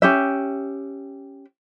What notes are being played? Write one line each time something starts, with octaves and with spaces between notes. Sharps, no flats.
C#4 G4 E5